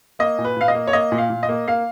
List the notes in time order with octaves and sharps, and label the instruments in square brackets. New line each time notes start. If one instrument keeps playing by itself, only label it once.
[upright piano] A#3 D#5
A#2
B4
A#2 F5
D#5
A#3
C#5
A#3 D#5
A#2
F5
A#2
D#5
A#3
A#3 F5